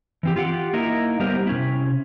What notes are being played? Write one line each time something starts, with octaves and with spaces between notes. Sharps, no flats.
E3 C4 G4
F4 G4 F#5 G5
A#3 D#4 E4 A#4 D#5 E5
G3 B3 G4 A#4 C5
C3 C#4 E4